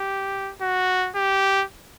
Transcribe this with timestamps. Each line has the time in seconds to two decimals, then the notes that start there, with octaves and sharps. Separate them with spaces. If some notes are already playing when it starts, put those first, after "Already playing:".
Already playing: G4
0.61 F#4
1.16 G4